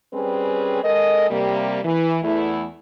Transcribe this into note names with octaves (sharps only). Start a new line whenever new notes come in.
G3 C4 C#4 G#4 B4
G#3 A4 A#4 D#5
C3 G3 A#3
E3
E2 A3 E4